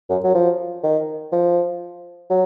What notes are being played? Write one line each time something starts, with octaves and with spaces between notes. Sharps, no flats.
F#2
F#3
F3
D#3
F3
F#3